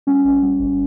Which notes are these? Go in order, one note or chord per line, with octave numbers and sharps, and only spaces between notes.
G3 C#4
G#1
G3
G1